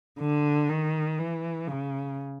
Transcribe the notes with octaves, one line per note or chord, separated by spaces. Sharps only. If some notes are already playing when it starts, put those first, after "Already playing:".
D3
D#3
E3
C#3